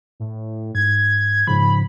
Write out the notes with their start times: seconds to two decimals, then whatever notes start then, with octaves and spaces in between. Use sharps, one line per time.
0.20 A2
0.75 G#2 G#6
1.47 G#2 C#3 F3 B5